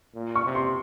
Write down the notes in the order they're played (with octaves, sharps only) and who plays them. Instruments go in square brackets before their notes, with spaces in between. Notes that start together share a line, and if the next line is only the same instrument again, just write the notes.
[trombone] A#2
[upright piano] C#6
[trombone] C3
[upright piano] C6